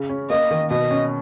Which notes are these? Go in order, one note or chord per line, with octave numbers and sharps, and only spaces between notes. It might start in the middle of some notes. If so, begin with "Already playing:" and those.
Already playing: C#3
C#4
A#3 D#5
D#3
B2 D#5
C#4